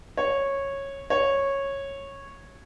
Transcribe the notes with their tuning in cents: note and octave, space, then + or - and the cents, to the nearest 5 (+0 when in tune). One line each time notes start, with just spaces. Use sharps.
C#5 -10
C#5 -10